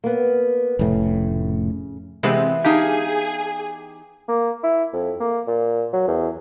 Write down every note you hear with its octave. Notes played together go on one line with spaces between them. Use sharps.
A#3 B3
F1 A2 C#3
C3 E3 G#3 B3 C4
D#4 G4 G#4 F5 A5
A#3
E4
F2
A#3
A#2
F#3
E2